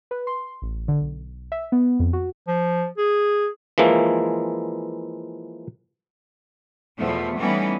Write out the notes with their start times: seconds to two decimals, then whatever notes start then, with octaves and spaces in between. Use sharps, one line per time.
0.11 B4
0.27 C6
0.62 A1
0.88 D3
1.00 B1
1.52 E5
1.72 B3
1.99 F2
2.13 F#4
2.47 F3
2.97 G#4
3.78 E3 F3 G#3 A#3 E4
6.99 E2 B2 F3 A3
7.38 E3 G3 A3 B3 C#4 D#4